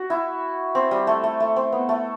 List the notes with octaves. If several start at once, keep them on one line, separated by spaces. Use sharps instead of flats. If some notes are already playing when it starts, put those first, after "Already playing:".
Already playing: F#4
E4
C4
G3
A3
A3
A3
C4
B3
A3